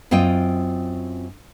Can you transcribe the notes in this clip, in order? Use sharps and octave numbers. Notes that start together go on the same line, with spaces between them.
F#2 C4 F4 D#5 G5